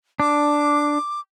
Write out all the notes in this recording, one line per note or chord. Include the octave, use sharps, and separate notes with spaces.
D4 D6